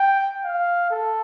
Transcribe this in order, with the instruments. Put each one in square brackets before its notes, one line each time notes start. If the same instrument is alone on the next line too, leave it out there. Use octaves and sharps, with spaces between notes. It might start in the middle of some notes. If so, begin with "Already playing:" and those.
Already playing: [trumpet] G5
F5
A4